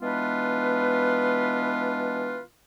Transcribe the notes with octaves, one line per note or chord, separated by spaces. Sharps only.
E3 G#3 B3 D4 F4 B4